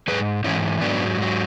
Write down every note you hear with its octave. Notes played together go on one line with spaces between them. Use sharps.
G#2 E3 G#4 B4
G#2 E3 C#4 E4
G#2 F#3 B3 D4
G#2 F#3